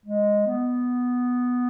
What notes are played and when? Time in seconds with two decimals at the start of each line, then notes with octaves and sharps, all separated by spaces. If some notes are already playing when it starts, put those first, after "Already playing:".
0.06 G#3
0.47 B3